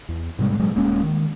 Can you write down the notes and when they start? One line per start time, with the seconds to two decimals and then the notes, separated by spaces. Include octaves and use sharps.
0.09 E2
0.39 G#2 C3 G3 G#3
0.59 A#2 F#3 G#3
0.75 D#1 G#3 A#3 C#4
1.03 D#3